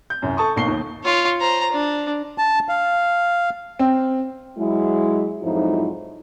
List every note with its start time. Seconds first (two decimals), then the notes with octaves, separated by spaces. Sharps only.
0.10 G6
0.22 C2 F#2
0.37 A4 A5 C#6 D#6
0.56 B1 A#3 C#6 C7 G7
0.68 D#2
1.04 F4 C#5
1.40 C5 A#5
1.71 D4
2.38 A5
2.69 F5
3.79 C4
4.58 F#3 G#3 E4
5.42 F2 G#2 F3 F#3 D#4 E4